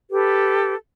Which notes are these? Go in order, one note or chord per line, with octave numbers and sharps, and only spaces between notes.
G4 A4 B4